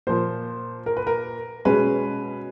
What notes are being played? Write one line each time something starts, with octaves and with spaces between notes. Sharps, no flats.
A#2 F3 A#3 C5
A#4
B4
A#4
B2 G#3 C#4 B4